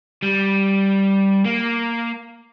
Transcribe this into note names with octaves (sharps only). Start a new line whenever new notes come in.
G3
A#3